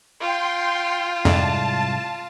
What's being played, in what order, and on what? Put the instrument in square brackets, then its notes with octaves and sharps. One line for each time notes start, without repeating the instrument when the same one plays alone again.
[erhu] F4 [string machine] G5 C6
[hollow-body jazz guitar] C2 G#2 D5 [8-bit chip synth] F2 [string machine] A5